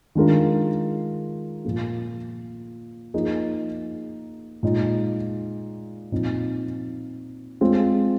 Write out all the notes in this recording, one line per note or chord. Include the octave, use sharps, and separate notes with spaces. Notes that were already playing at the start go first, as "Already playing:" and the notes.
D#3 G#3 D4 F4 A#4
A#2 F3 A#3 F4
F3 A#3 D#4 G#4
A#2 G#3 D#4
A#2 F3 C4 D#4
G#3 C4 F4